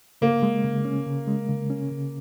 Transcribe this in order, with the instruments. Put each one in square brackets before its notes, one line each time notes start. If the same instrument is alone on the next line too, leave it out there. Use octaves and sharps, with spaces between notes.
[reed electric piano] C#3 [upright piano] A#3
[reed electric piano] G#3
C#3
C#4
C#3
G#3
C#3
C#4
C#3